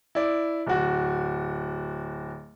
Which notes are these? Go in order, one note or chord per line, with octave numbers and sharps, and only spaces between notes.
E4 D5
D1 F#4